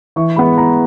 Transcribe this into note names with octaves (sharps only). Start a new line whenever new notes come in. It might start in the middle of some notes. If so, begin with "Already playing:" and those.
E3 C#6
G#3 B3 B5
E3 A#5